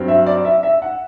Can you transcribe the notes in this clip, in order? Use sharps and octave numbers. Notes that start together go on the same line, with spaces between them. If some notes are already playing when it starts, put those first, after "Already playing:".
Already playing: G2 F#3 C4
E5
D5
E5
E5
F#5